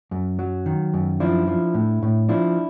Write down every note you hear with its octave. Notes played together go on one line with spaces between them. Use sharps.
F#2
F#3
D#3
F#2
F3 D4 E4
F3
A2
A2
F3 D4 E4